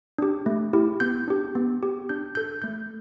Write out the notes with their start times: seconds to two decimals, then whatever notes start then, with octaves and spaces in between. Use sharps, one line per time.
0.18 D4 G4
0.46 A3
0.73 E4 G4
1.00 B3 G6
1.28 D4 G4
1.55 B3
1.83 G4
2.09 D4 G6
2.35 A4 G6
2.62 A3 G6